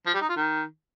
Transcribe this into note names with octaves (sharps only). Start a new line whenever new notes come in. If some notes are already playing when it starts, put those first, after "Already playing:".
F3
G3
D#4
F4
D#3